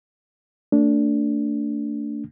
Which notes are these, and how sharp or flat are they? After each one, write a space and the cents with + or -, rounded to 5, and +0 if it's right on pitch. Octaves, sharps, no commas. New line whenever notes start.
A3 +30 D4 -15